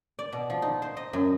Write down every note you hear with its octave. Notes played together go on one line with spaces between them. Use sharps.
D5
B2
F3
D#4
C5
D#5
F#2